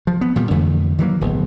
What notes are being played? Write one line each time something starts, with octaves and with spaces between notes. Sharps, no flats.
F3
B3
A#2 D#3 G3
F2 D3 E3 A3
D#3 E3 F#3 A#3
D1 B1